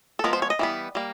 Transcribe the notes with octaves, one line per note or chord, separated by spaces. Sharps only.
A4
F3 G#3 B3 A#4
C5
C#5
D#5
E3 G3 B3
G3 A#3